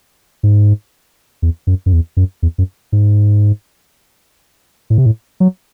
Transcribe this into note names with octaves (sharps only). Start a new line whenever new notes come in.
G#2
E2
F#2
F#2
E2
F#2
E2
F#2
G#2
A2
C3
A2
F#3